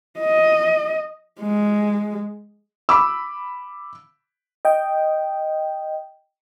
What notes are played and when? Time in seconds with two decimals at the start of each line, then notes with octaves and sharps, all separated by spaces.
0.19 D#5
1.41 G#3
2.89 B5 D6 E6
4.65 D#5 G5